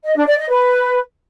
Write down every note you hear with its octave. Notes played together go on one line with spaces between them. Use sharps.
D#5
D4
D5
D#5
B4